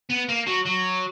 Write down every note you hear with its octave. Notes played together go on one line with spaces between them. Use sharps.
B3
A#3
F#3
F#3